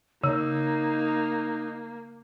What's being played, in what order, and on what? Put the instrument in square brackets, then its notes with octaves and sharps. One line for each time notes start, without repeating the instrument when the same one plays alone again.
[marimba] C#3 E6 [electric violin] A#3 [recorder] D#4